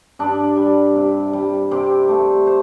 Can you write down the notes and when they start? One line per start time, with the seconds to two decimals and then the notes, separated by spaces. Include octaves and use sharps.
0.19 G2 D4
0.57 G3
0.95 C3
1.33 G3
1.71 C3 G4 C5
2.09 A3
2.47 C5